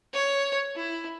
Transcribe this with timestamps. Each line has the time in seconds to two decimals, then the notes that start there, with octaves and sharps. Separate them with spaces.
0.14 C#5
0.76 E4